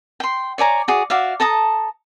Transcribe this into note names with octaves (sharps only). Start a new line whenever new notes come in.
G5 C6
C#5 D5 G#5 A#5
F#4 G#4 D5
F#4 D5 E5 F5
A4 A5 A#5 D#6